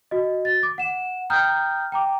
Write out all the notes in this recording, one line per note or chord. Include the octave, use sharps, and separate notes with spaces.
F#4 D#5
A6
D6
F#5 E7
G5 A#5 D#6 F6 G6
G5 A#5 D6